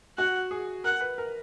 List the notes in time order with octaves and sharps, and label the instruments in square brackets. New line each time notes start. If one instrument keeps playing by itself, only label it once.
[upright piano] F#4 [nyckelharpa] F#5
[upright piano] G#4
[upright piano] A#4 [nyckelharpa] F#5
[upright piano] B4
A#4